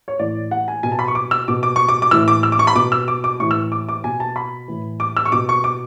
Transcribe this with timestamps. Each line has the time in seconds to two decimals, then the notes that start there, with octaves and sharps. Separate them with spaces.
0.08 C#5
0.19 A2 E3 D5
0.51 F#5
0.68 G#5
0.83 B2 G#5
0.92 A5
0.99 B5
1.08 C#6
1.15 D6
1.31 E6
1.48 B2 D6
1.63 D6
1.76 C#6
1.89 D6
2.02 D6
2.11 A2 E3 E6
2.28 D6
2.43 E6
2.52 D6
2.59 C#6
2.67 B5
2.75 B2 D6
2.92 E6
3.08 D6
3.24 D6
3.40 A2 E3 C#6
3.51 E6
3.72 D6
3.89 D6
4.04 B2 G#5
4.20 A5
4.36 B5
4.68 A2 E3
5.00 D6
5.17 E6
5.26 C#6
5.32 B2 D6
5.49 C#6
5.64 D6